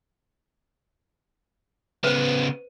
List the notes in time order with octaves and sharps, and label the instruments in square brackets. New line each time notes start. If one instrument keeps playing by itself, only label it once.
[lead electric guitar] C#3 B3 [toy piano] B4 C5